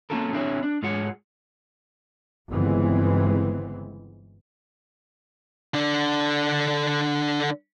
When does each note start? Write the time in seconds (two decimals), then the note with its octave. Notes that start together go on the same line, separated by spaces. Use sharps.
0.10 A#3 C4 C#4 F4 A4 A#4
0.33 C4 D4 E4 G#4 B4 C#5
0.63 D4
0.83 G#2 F4 G#4 C#5 F#5
2.50 G1 C#3 E3 G#3 B3 C4
5.74 D3 D4